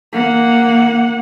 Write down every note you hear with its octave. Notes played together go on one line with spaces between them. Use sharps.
A#3 F#5